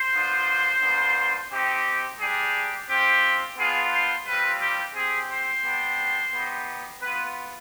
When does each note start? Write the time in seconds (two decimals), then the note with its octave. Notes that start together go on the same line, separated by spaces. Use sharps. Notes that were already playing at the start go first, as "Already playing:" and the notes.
Already playing: C5
0.14 B3 D4 F4
0.82 B3 D4 F4
1.52 C4 D#4 G4
2.20 G3 D4 G4 G#4
2.89 C4 F4 G4
3.58 B3 D4 F4 G#4
3.93 C5
4.27 G3 C4 F4 B4
4.61 G4
4.96 C4 G4 G#4
5.31 C5
5.64 B3 D4 G4
6.34 B3 D#4 G4
7.02 B3 F4 B4